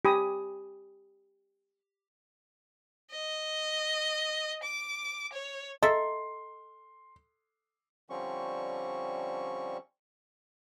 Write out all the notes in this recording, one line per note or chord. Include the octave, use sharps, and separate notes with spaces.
G4 G#5 B5 D#6
D#5
D6
C#5
A4 D#5 E5 A#5 C6
D3 F3 G3 C4 C#4 C#6